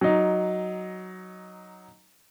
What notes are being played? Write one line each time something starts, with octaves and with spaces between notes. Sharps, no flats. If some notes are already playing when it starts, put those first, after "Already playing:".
F#3 D#4